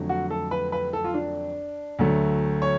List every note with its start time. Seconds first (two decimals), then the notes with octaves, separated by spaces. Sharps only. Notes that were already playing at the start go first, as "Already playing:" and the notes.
Already playing: F2 D3 F#3 A3
0.09 F#4
0.31 A4
0.51 B4
0.72 B4
0.93 A4
1.04 F4
1.14 D4
1.99 D2 D3 F#3 A3
2.62 C#5